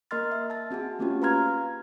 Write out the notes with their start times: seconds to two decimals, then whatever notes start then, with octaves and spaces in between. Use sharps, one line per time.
0.11 A#3 A#4 D#5 C6 F6 A6
0.32 E5
0.50 A5 A6
0.71 C4 F#4 G#4 A5
0.99 A3 A#3 C4 C#4 F4 G4
1.22 B4 F5 A#5 C6 F6 G#6